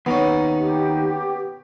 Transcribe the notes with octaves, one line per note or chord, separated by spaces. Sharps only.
D#2 B3 C#4 D#4
G4